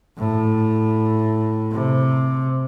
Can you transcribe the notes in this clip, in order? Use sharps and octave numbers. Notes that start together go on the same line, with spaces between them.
A2
C3